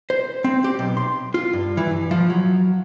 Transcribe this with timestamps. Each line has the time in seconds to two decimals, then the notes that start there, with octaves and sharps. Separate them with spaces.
0.10 C5
0.44 C4
0.64 G4
0.79 B1
0.97 C6
1.34 F4
1.53 G2
1.77 E3
1.91 G2
2.11 F3
2.30 F#3